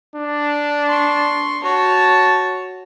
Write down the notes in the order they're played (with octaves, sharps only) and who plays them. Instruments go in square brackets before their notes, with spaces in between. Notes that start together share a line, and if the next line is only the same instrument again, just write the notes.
[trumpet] D4
[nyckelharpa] C6 C#6
[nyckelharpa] F#4 C#5 [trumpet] A5